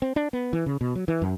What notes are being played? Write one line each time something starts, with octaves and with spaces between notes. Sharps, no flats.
C4
D4
B3
E3
C#3
B2
F#3
E3
F#2